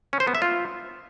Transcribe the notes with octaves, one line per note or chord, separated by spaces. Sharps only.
C#4
C5
B3
E5
F4